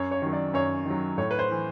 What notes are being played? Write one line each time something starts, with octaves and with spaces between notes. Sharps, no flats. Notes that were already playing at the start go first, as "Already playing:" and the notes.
Already playing: F#2 C#5
C#5
D#3 F#3
D5
F#2 C#5
D#3 F#3
A2 C#5
B4
C5
E3